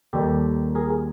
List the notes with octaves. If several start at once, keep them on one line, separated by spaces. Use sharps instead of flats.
D#2 D#3 G3 G4 A4
G#4 A#4